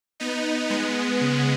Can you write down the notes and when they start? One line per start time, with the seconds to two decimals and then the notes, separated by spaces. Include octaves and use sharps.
0.20 B3 D#4
0.69 G#3 B3
1.21 C#3